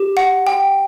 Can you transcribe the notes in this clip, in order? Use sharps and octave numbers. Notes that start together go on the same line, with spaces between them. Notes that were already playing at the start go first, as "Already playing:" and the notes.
Already playing: G4
F#5
G5